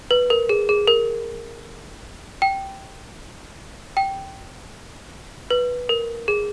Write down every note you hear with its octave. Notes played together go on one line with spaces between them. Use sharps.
B4
A#4
G#4
G#4
A#4
G5
G5
B4
A#4
G#4